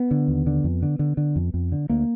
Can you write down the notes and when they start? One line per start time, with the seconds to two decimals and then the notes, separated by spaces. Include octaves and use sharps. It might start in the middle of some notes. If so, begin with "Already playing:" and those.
Already playing: B3
0.11 D3
0.28 D#2
0.47 D3
0.64 F2
0.83 D3
0.99 D3
1.17 D3
1.36 F2
1.54 F2
1.72 D3
1.89 D2 A#3